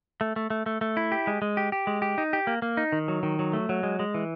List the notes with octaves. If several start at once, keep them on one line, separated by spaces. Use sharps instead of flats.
A3
A3
A3
A3
A3
E4
G4
G#3
G#3
G4
G4
G#3
G4
D#4
G4
A#3
A#3
D#4
D#3
F#3
D#3
F#3
A3
F#3
G#3
G#3
E3